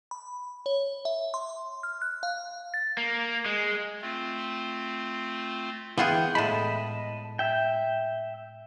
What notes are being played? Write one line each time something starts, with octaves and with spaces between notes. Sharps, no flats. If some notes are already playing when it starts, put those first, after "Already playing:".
B5
C#5
E5
C6
F6
F#6
F5
A6
A#3
G#3
A3 C4 F4
E3 B3 F4 G#4 F#5 G5
A2 G#3 D#5 A5 B5
E5 G5